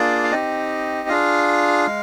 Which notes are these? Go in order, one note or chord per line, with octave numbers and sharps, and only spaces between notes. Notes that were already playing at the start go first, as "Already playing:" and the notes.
Already playing: A#3 D4 F4 G#4 D5
F5
C4 D#4 G4 D#5
D4 F4 G#4 F5
G#3